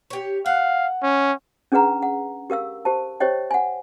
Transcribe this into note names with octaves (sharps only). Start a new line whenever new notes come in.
G4 C#5
F5 F#5
C#4
C#4 D4 G#4 B4 F#5 A#5
F#5
G4 A#4 F5 E6
G4 C5 A5
G4 C5 C#5 D#5 G5
F#5 G#5